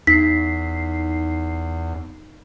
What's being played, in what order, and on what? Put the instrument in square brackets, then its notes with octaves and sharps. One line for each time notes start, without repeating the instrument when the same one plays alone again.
[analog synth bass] E2 [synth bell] D#4 C7 [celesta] B6